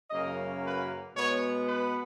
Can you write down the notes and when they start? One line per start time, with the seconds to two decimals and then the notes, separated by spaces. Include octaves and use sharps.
0.10 F#2 C#3 F#3 A#3 C#4 D#5
0.63 B4
1.13 B2 G#3 B3 C#5
1.65 B4